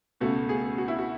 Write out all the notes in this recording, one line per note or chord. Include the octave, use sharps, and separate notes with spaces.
C#2 B2 A3 F#4
G#4
F#4
E4
F#4